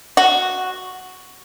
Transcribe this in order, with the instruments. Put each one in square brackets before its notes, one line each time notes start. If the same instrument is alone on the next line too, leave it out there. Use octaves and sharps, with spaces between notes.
[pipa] F#4